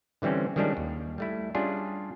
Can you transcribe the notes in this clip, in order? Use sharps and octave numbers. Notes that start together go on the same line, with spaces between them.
D3 E3 G3 C4 C#4
D#3 F3 G3 G#3 C#4 D4
D#2
G3 A3 E4
G3 C#4 D4 F4 G#4